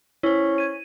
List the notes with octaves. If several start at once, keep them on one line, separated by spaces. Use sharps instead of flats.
C#4 E4 C5
G#6 D#7